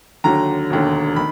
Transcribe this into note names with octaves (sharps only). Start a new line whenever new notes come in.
D#2 D3 F#3 A#5
E1 D#2 D3
D#3 B5